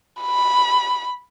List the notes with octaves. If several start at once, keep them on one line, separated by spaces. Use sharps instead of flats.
B5